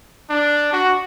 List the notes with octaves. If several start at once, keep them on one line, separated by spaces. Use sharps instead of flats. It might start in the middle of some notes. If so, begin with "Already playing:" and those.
D4
F#4